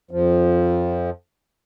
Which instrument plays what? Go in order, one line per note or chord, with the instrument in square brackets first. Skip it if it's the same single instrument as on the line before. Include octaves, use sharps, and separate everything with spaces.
[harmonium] F2 F3